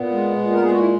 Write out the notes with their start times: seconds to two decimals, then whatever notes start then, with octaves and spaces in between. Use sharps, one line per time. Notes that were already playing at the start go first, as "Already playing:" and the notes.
Already playing: A#2 B3
0.11 G#3
0.38 A#2
0.52 A#4
0.62 G#3 G#4
0.70 F#4
0.78 E4